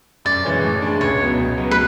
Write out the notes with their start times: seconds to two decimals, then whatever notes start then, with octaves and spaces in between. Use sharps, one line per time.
0.25 F#2 D5
0.44 C#3 E3 G#3 C#4
0.63 A2
0.82 G#3 D4
1.01 C#2 C#5
1.20 B2 F#3
1.38 C#2
1.58 B2 F#3 B3
1.71 B4